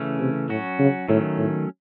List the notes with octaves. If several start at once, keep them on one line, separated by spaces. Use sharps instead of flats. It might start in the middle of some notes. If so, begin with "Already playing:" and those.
Already playing: C#3 E3 A3 C#4
C3
A2 F#3 C#4 F#4
C#3
A2 D#3 F#3 A3 C#4
A2